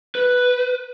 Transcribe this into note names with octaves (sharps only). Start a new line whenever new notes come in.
B4